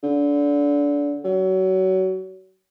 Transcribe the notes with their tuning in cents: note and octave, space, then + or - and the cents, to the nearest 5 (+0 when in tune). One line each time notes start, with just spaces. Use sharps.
D3 -25
F#3 +30